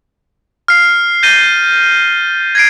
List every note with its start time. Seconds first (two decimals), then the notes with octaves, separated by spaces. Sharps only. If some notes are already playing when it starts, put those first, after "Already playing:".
0.68 F6 C7
1.23 G6 A6 A#6 D#7 G7
2.55 G#6 A#6 C7 D7